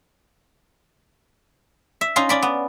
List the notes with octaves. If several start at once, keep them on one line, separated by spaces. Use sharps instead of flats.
E5
C#4 D#4 F4 F5 A#5 C6
C#4 D5 B5
B3